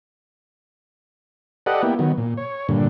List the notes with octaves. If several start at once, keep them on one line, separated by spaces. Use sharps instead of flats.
G4 A4 B4 D5 D#5 F#5
A#3 B3 E4 G4
D#3 F#3 B3
A#2
C#5
G2 A#2 D3